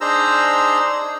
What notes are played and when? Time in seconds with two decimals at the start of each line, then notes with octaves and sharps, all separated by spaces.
0.01 D4 D#4 G#4 C5 A#5 E6